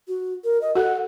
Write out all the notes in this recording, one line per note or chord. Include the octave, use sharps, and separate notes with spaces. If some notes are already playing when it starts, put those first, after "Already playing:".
F#4
A#4
D#5
F#4 A4 F#5